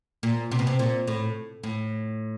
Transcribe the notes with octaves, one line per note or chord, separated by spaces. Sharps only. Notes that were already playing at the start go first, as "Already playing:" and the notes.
A#2
C3
B2
C3
A#2
A2
A2